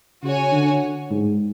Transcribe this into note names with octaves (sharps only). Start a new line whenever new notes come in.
C#3 F#4 C#5 G#5
D3
G#2